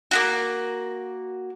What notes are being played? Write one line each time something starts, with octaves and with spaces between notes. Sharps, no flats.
A#3 B3 F#4